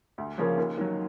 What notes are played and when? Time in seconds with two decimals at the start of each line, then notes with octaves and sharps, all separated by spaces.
0.18 D2
0.38 C#3 F3 A#3 C#4
0.57 D#2
0.78 D#3 F#3